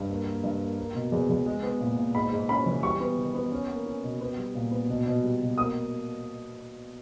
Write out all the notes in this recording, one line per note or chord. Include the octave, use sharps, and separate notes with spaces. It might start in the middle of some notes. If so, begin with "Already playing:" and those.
Already playing: G2
A#3
A#3
G2
A#3
A#3
B2
E2
E2
G#3
B3
A#2
A#2
G#2 B5
G#2
C#4 B5
E3
G3 C#6
B3
D#3
B3
C#4
A#3
C#4
B2
B3
G3
A#2
B3
B2
B2
G3
B2
A#3 D#6